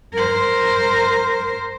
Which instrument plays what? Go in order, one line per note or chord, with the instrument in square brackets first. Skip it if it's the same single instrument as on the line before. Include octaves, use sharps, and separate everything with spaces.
[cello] A#4 C5